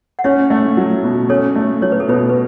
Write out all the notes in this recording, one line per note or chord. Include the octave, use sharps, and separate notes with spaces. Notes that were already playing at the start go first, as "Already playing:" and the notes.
F#5
C#4 C#5 E5
A3
F#3
B2
C#4 A4 C#5
A3
F#3 C#5
B4
A4
B2 B4
B4